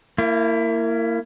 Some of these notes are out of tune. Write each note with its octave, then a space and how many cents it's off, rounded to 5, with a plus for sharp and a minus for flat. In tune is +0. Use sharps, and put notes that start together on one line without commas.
A#3 -25 E4 +15